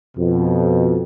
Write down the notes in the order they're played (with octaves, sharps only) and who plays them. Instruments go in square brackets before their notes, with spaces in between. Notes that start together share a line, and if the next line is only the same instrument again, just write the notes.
[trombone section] F2 B2